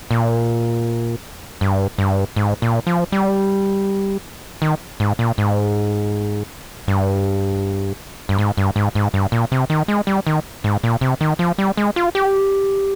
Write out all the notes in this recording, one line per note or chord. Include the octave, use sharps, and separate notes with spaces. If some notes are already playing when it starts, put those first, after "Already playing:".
A#2
G2
G2
G#2
A#2
F3
G3
D#3
G#2
A#2
G#2
G2
G2
G#2
G2
G#2
G#2
G2
A#2
C3
D#3
G#3
G3
D#3
G#2
A#2
C3
D#3
F3
G3
G#3
F4
G4